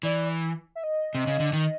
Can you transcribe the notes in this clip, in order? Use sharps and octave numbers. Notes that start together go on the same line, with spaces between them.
E3 D5
E5
D#5
C3
C#3
D3
D#3